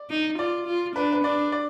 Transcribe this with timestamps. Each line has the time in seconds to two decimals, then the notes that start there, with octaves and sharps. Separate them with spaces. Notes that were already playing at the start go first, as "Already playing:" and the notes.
Already playing: D5
0.10 D#4
0.39 F4 D5
0.67 F4
0.96 D4 B4
1.12 B4
1.24 D4 D5
1.52 D5